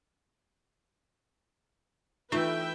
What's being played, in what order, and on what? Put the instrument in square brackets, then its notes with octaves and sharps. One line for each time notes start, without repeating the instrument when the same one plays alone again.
[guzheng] E3 A3 [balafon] D#4 F4 C#6 [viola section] B4 E5 G5